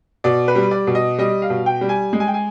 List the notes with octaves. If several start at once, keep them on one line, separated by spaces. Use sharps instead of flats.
B2 D5
B4
G3
D5
B2
D#5
G3 D#5
F5
B2
G5
G3
G#5
G#3
G#5
G5
G#5